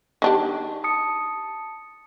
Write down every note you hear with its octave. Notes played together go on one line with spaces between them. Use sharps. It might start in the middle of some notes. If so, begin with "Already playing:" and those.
D#3 D4 G4
A5 D#6 C#7